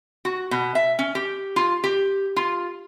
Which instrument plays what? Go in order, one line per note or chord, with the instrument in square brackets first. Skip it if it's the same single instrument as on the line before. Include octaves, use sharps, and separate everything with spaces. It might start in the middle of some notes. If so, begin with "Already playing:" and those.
[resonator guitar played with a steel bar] F#4
B2
E5
C#4
G4
F4
G4
F4